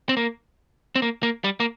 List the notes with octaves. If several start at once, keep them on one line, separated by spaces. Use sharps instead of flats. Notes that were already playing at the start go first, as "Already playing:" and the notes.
C4
A#3
C4
A#3
A#3
G3
A#3